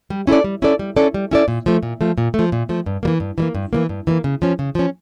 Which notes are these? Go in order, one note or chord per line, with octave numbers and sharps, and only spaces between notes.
G3
C#4 E4 A4 D5
G3
C#4 E4 A4 D5
G3
C#4 E4 A4 D5
G3
C#4 E4 A4 D5
A#2
F3 A3
A#2
F3 A3
A#2
F3 A3
A#2
F3 A3
G2
E3 G3 A#3
G2
E3 G3 A#3
G2
E3 G3 A#3
G2
E3 G3 A#3
C#3
F3 C#4
C#3
F3 C#4